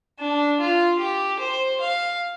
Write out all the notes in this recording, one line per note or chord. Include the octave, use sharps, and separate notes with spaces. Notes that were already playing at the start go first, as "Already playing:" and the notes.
D4
F4
G4
C5
F5